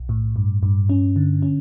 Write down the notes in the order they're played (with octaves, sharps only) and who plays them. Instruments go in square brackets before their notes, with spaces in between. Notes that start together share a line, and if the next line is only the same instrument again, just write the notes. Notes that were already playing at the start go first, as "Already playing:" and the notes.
Already playing: [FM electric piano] B1
A2
G2
G2
C#4
D3
C#4